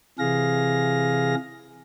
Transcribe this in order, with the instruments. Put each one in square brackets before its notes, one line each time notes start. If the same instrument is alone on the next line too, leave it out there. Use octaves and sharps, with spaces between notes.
[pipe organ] C3 E3 G#4 F5 A#6